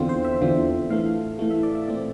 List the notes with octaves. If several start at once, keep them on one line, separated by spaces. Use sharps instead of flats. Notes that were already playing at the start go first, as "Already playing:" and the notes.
Already playing: E2 D3 F3 C4 F4
C5
E5
E2 D3 F3 C4
A2 E3 A3 F5
A2 E3 A3
E5
D5
E5
A#2 A3 C4 D5